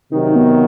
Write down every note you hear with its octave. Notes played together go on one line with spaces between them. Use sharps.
C3 D#3 F#3 D#4
B3